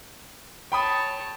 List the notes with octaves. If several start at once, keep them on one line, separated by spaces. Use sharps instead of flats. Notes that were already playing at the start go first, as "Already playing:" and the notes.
C#5 G5 A5 B5 D#6